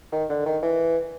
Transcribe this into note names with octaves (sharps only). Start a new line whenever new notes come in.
D#3
D3
D#3
E3